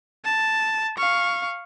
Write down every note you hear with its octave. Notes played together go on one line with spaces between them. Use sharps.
A5
F5 C#6